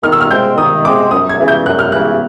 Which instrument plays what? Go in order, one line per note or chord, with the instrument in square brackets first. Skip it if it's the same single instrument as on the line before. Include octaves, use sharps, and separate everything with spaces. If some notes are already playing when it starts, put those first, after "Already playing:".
[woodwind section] D#3 [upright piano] F6
[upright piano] E6
F6
[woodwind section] G#3 C4 [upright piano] G6
[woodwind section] D#3 [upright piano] D#6
[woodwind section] G#3 C4 [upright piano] D6
[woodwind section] F#2 [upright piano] D#6
[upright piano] G#6
[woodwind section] C#3 E3
[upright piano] G6
[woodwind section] F#2 [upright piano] F#6
[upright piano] F6
[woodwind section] C#3 E3 [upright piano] F#6